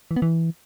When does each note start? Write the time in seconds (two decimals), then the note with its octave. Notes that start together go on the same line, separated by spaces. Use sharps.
0.11 E3
0.16 B3
0.22 E3